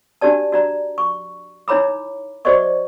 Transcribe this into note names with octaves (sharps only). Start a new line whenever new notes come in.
D4 F#4 G4 D5 A5
F#4 D5 A#5
C#6
D#4 E4 C#5 A#5 B5 D6
F#4 G#4 C5 D5 D#5 C#6